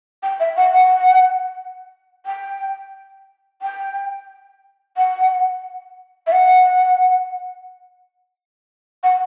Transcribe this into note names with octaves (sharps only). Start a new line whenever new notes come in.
G5
E5
F#5
F#5
G5
G5
F#5
E5
F#5
F#5